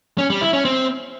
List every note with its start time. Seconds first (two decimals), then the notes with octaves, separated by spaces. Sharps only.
0.18 C#4
0.30 G3
0.42 E4
0.53 C#4
0.65 C4